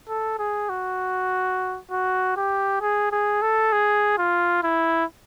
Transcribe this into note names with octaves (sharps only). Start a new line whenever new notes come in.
A4
G#4
F#4
F#4
G4
G#4
G#4
A4
G#4
F4
E4